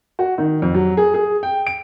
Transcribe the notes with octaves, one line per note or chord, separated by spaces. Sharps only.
F#4
D#3
F2
F#3
G#4
G#4
G5
D7